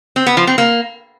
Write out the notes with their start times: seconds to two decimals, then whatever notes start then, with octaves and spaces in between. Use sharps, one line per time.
0.16 C4
0.26 B3
0.37 F3
0.47 C4
0.58 A#3